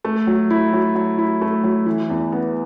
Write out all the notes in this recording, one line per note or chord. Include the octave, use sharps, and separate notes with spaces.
A3
F#3
E4
F#3
F#3
E4
A3
F#3
E3
E2
B3